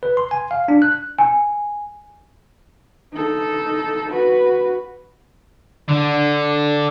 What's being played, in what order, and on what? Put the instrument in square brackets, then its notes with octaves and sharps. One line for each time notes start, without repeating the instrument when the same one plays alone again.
[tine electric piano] B4
C6
G#5
F5
D4
F#6
[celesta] G#5
[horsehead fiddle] D#4 A4
F#4 B4
[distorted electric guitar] D3